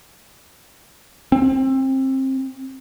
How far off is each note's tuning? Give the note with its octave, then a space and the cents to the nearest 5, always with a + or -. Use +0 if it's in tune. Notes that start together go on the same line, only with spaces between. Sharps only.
C4 +25